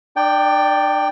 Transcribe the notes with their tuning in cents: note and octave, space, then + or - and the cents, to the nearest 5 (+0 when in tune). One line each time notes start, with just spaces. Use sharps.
D4 +45 D5 +0 G5 +5